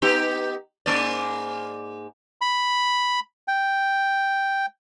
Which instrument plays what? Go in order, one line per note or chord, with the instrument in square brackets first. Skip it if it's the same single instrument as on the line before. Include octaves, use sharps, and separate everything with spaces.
[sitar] B3 D#4 G4
G#2 A#3 D5
[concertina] B5
G5